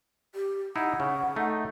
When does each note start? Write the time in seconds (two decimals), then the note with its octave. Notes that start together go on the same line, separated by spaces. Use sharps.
0.35 G4
0.76 D#4 E4 F#5
1.00 C#3
1.36 A3 D#4